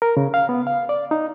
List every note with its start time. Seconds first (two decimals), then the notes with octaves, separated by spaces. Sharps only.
0.02 A#4
0.17 C#3
0.34 F5
0.49 B3
0.67 F5
0.89 D5
1.11 D#4